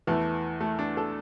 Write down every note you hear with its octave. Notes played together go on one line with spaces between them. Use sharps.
E2 E3 A3
A3
D4
A4